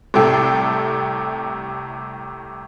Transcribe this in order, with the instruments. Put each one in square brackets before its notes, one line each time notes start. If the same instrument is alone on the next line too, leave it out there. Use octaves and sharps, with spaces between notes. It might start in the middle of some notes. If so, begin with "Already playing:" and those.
[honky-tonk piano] C2 A2 C3 A4 G5 C7